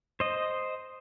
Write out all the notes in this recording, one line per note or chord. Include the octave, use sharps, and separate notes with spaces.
C5 D#5